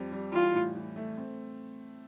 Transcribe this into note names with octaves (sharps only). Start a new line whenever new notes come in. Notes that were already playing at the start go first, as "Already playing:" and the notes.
Already playing: F2 G3 C4
G3
E3 F4
A2
E3
A3
C4